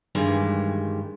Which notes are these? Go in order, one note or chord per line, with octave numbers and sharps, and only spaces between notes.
G2 D#3 E3 G3 G#3